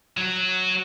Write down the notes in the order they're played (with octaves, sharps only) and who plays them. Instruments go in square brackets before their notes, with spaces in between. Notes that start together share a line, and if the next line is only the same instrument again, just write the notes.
[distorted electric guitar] F#3 F#4